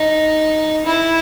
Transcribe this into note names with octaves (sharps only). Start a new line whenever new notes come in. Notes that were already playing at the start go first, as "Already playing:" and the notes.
Already playing: D#4
E4